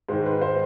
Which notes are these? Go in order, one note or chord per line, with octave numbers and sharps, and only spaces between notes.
G#2 D#3 C5
B4
C5